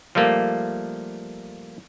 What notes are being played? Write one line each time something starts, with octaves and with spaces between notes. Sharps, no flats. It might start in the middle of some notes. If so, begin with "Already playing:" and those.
F3 G3 A3 A#3